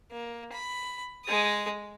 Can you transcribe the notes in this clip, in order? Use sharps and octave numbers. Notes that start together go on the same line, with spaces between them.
A#3
B5
G#3 D#6